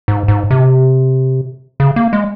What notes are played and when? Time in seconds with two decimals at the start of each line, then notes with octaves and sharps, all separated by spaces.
0.08 G#2
0.28 G#2
0.51 C3
1.80 C#3
1.96 A#3
2.13 G#3